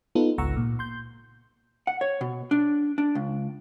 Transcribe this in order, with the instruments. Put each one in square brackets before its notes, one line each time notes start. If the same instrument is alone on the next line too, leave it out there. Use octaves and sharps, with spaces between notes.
[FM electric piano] B3 D#4 F4 A4 B4
G#1 C#2 F#5 A#5 C#6 E6
A#2
C6 G6
[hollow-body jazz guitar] F#5
C#5
B2
D4
D4
C#2